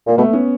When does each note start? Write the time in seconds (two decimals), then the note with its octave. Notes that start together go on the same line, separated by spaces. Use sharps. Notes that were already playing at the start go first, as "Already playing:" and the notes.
0.07 A#2 A#3
0.18 B2 A3 B3
0.33 B3 C#4